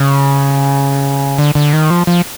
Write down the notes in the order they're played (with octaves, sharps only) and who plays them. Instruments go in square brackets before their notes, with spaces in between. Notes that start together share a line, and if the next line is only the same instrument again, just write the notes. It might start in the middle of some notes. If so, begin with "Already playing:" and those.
Already playing: [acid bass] C#3
D3
D3
D#3
F3
F3